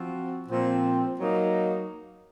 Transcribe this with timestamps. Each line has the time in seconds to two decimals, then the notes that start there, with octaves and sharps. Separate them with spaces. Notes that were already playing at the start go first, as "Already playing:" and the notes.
Already playing: F3 C4 F#4
0.48 A#2 F3 C4
1.18 F#3 A#3 D#4